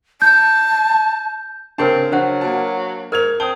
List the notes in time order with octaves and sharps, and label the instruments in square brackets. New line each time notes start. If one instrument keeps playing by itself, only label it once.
[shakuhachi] A5 [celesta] G6
[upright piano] C#3 A5 [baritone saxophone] C4 [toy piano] D4 G4 A#4
[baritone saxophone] F#3 [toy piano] D4 C5 F#5
[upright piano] A#3 F#4 A5
[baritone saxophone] G#2 [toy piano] A#4 [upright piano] F6 G#6 F7
[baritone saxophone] C4 [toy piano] A5 [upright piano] D#6 G7